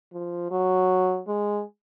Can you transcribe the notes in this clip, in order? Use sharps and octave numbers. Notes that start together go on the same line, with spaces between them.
F3
F#3
G#3